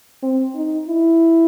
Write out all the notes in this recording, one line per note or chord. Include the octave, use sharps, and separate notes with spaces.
C4
D#4
E4